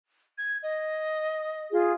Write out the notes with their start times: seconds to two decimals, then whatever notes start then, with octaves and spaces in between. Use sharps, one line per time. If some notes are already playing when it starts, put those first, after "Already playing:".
0.38 G#6
0.63 D#5
1.71 F4 G#4